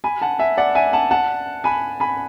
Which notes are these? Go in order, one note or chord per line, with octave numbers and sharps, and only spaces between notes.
G#5 B5
F#5 A5
E5 G#5
D5 F#5
E5 G#5
F#5 A5
F#5 A5
G#5 B5
G#5 B5